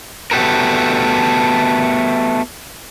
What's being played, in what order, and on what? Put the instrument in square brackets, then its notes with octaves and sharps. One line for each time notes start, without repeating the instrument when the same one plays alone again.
[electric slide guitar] A3 B3 F#4 G4 A4 A#4